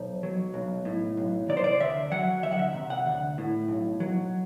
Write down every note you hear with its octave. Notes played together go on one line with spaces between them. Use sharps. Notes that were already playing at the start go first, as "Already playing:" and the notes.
Already playing: B1 C5
F#3
B1
A2
B1
C3 D5
C5
D5
D2 E5
F#3 F#5
D2 E5
F#5
E5
C3
F#5
D2
A2
B1
F#3